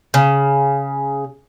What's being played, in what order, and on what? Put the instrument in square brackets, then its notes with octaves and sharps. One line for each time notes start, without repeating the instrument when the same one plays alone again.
[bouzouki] C#3